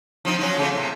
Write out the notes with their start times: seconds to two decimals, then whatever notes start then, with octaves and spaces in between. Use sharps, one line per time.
0.25 F3 C4 D#4
0.39 F3 F#3 C#4
0.57 C#3 A3 C4
0.75 A2 C3